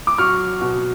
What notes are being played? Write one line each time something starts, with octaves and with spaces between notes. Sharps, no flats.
D6
F#3 C#6 F6
B2